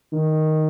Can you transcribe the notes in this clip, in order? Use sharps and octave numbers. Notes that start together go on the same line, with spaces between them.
D#3